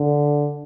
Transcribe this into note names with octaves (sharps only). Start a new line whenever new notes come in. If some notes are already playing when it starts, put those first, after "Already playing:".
Already playing: D3